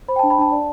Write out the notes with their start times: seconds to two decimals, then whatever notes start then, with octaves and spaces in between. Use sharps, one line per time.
0.08 C5 B5
0.16 G5
0.19 A5
0.23 D4
0.30 B5
0.39 D4 A5
0.52 D5